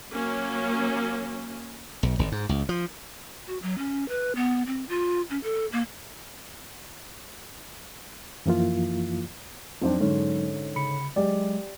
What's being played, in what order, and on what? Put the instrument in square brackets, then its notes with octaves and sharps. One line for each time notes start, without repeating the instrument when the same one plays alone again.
[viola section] F#3 A#3 C#4
[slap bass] B1
G#1
G#2
C#2
F3
[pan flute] F#4
F#3
C#4
B4
B3
C4
F4
C#4
A4
A#3
[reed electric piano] F#2 E3 F3 A#3 E4 F4
[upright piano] F2 C4 D4 [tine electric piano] F#3 D#4
[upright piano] G#2 D3 C#4
[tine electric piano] C#3 B5 C#7
[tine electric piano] F#3 G#3 [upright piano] G4 D5